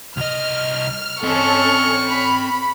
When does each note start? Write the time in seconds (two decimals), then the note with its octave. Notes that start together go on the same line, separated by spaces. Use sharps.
0.17 C2 D#5 F6
1.23 C4 C#4 A4 D#5 C#6 F6
2.07 B5